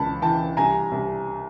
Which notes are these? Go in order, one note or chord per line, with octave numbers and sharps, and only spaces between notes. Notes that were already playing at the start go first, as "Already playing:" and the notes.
Already playing: C#2 E3 A5 B5
E3 G5 A5
C2 G#5 A#5
C2